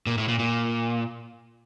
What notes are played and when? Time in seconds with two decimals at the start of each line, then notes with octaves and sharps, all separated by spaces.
0.06 A#2
0.18 A2
0.28 A#2
0.39 A#2